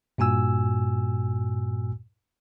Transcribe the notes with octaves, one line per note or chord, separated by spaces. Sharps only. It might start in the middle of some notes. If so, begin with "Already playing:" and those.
G2 A#2 F#4 G#5 E6